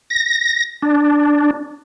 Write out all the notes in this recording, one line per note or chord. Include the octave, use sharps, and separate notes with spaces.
A#6
D4